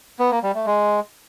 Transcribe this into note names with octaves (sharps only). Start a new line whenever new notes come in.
B3
A#3
G3
A3
G#3